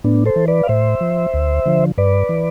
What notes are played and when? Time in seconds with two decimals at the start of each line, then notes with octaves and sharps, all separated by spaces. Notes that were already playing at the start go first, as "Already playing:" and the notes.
0.04 A2 B3 D4
0.26 A4 C5
0.36 E3
0.48 B4 D5
0.63 F5
0.68 A2 C5 E5
1.01 F3
1.34 D2
1.66 D3 F3
1.98 G2 B4 D5
2.29 E3